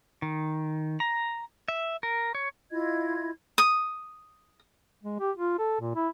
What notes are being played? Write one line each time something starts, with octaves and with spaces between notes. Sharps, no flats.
D#3
A#5
E5
A#4
C#5
E4 F4 D#5 G#6
D#6
G#3
G4
F4
A4
A#2
E4